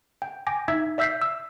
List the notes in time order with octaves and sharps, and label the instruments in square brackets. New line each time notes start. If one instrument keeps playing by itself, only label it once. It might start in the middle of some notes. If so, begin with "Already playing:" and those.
[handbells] G5
G5 G#5 D6 A#6
D#4 E5 E6 G#6 B6
D5 E5 E6 G6 B6 C7
E6